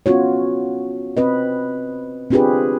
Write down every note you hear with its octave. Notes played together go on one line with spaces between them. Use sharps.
B3 C#4 F4 F#4 C#5
C4 B4 D#5
C4 D4 F4 G4 G#4 B4